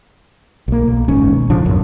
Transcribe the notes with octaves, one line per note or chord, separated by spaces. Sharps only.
B1 A#3
B1
F#1 G#2 D#3 C#4
B2
A2 C#3 F3 D4
D#1 B1 F#2 F#3